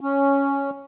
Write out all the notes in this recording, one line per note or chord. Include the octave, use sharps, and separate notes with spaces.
C#4